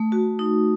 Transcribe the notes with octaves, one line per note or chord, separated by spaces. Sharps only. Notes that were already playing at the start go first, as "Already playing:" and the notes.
Already playing: A3
F#4
D#4